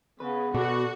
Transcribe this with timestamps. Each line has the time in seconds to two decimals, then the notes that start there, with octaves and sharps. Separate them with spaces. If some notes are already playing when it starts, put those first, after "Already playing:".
0.20 C#3 B3 B4
0.55 B2 F#4 A4 B4 D5